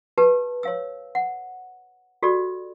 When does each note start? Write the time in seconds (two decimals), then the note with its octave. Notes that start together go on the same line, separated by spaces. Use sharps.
0.18 G4 B4 A5
0.63 C#5 F5 E6
1.15 F#5
2.23 F#4 G4 A4 D5